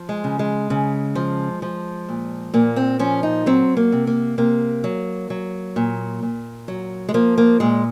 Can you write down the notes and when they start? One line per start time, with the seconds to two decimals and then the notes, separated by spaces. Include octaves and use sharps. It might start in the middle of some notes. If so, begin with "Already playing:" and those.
Already playing: F3
0.09 G#3
0.24 C#3
0.39 G#3
0.70 C#3
1.15 F3
1.62 F3
2.09 A#2
2.54 A#2 A#3
2.76 C4
2.99 F3 C#4
3.23 D#4
3.46 F#3 C4
3.77 A#3
3.92 C3
4.07 A#3
4.38 C3 A#3
4.84 F#3
5.30 F#3
5.76 A#2
6.23 A#2
6.68 F#3
7.09 G#3
7.14 F3 A#3
7.38 A#3
7.60 A#2 G#3